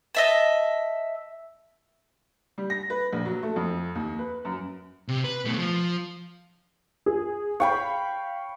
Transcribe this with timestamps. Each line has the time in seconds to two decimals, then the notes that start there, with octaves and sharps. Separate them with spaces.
0.15 D#5 E5 A5
2.58 G3
2.70 A#6
2.90 B4
3.12 A#1
3.25 F#3
3.43 A3
3.56 F2
3.95 D#2
4.19 B4
4.45 F#2
5.08 C3
5.24 B4
5.45 B2 A3
5.58 F3
7.06 G#4
7.60 C#5 F5 G5 B5